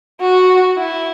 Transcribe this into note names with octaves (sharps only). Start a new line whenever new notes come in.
F#4
E4